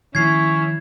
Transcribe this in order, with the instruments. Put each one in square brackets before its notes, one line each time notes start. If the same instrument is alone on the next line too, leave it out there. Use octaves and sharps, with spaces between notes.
[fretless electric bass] D#3 F3 A#3 [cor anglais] C#4 [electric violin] E4 [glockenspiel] G#6 C7